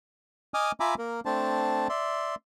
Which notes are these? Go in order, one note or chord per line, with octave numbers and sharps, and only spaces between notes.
D#5 G#5 D6 D#6 F6
F4 E5 G#5 A#5 B5 D6
A#3 A#4
A3 C4 D4 C5 A5
D5 E5 C6